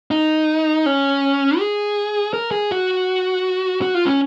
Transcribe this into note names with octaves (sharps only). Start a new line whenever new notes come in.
D#4
C#4
G#4
A#4
G#4
F#4
F#4
F4
C#4